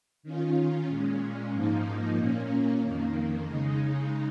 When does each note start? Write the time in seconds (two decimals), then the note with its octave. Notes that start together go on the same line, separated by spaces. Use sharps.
0.23 D#3 C#4 F4
0.88 A#2 G#3 C#4
1.52 G#2 F3 A#3 D#4
2.16 A#2 A#3 C#4
2.80 F2 D#3 A#3
3.45 C#3 G#3 D#4